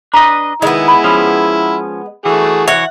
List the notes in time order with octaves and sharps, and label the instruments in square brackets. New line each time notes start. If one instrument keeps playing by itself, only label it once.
[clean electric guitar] D4 B4 D#5 [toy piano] A#5
[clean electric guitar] D#3 [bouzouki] G#3 B3 [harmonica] E4
[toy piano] B5
[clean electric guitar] F3 C#4 [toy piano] D#6
[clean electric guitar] E3 [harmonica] A3 F#4 G#4
[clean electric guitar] E3 F#4 C#5 [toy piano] E5 [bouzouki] F#5